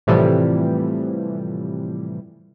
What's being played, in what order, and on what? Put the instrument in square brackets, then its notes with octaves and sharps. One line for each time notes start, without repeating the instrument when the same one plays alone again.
[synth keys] A2 C3 E3 F3 G3